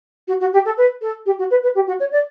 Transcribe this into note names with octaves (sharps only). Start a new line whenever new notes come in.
F#4
F#4
G4
A4
B4
A4
G4
F#4
B4
B4
G4
F#4
C#5
D5